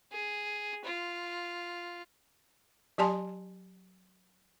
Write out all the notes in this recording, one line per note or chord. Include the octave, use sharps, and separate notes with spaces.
G#4
F4
F#3 G4 D5 G#5 A5 C6